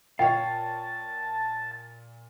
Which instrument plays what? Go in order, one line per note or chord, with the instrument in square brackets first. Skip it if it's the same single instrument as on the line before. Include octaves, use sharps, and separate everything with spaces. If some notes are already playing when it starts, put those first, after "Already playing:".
[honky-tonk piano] A#2 [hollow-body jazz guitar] C#5 F5 [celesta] G5 [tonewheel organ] A5